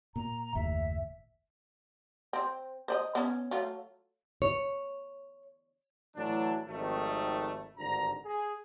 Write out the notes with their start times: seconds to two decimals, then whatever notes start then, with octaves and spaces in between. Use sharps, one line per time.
0.16 A#2 A#5
0.55 F#1 D#2 A2 E5
2.33 C4 C5
2.88 C5 D5 D#5
3.15 B3 C#4
3.51 F#3 A3 F4
4.42 C#5
6.16 A2 E3 F#3 D4
6.68 G#1 F2 D#3 G3 A3
7.78 G#1 G2 D3 A#5
8.25 G#4